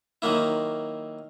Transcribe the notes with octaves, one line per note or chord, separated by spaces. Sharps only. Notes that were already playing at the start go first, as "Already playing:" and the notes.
D#3 F#3 A#3 E4